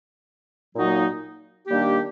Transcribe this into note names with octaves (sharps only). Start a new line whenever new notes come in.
A#2 F#3 A#3 D#4 F#4
D#3 G3 A#3 D4 G4